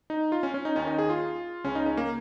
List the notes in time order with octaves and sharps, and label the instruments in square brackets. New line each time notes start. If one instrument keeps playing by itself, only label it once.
[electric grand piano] D#4
F4
C#4
C#4
D#4
D#2 D#3 C#4
D#4
G#4
F4
C#2 C#3 C#4
D#4
C#4
A#3